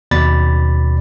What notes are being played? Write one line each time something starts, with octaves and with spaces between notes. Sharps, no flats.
D#2 B2 D5 B5 A6